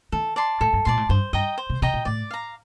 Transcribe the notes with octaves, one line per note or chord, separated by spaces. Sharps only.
D#3 A4
D5 A5 C6
A2 A4
G2
A#2 D5 A5 C6
A2
G2 C5
G2 D#5 G5 A#5
C5
C3
C3 D#5 G5 A#5
A#2
A2 D5
F5 A#5